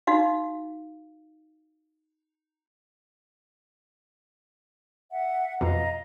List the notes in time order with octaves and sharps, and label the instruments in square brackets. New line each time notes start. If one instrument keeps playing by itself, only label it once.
[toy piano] D#4 F#4 F5
[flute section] E5 F#5
[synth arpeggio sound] F2 B2 [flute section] D#5 F5 A#5